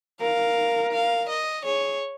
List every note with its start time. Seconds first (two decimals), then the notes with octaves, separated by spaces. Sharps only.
0.21 A#4 F5
0.93 F5
1.29 D#5
1.65 G#4 C#5